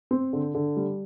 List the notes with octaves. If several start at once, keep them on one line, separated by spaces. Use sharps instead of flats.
C4
D3
D3
G3